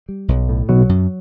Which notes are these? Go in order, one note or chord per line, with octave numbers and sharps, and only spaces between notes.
G3
B1
A2
B1 B2 F#3
F#2